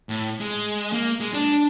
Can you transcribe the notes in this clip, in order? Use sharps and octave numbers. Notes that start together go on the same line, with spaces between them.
A2
G#3
A#3
G#3
D4
D4